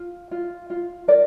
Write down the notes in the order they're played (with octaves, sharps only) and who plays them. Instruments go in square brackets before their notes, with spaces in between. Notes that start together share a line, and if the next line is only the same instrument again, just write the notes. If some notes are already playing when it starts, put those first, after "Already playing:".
Already playing: [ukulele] F4
F4
F4
A#4 D5